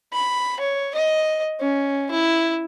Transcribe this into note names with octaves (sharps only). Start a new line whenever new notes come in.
B5
C#5
D#5
C#4
E4